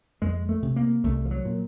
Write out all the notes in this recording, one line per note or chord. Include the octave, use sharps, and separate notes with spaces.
F2 G#3
A3
C3
A#3
C2 A3
F3
F#3
A#2